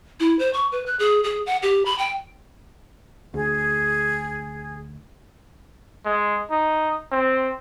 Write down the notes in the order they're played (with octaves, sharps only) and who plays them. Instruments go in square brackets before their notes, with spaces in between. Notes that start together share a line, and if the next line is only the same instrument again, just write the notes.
[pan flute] E4
C5
C#6
B4
F#6
G#4
G#4
F#5
G4
B5
G5
[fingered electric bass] D2 [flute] G#4
[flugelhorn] G#3
D#4
C4